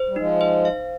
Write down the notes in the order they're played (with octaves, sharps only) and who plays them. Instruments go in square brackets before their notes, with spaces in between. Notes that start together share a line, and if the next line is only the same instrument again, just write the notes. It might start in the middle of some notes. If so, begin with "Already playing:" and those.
Already playing: [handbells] C5
[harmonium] G3
[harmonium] F3 G#3 [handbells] D#4
[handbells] C5
F5